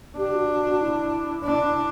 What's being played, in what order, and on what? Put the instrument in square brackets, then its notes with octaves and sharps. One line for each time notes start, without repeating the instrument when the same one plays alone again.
[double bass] D4 [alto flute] G4
[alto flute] F#4
F#4
F#4
E4
[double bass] D4